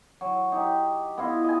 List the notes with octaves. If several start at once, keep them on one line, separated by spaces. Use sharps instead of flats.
F#3
D#4 G4
B3 E4 F4 D#5
D#5 G#5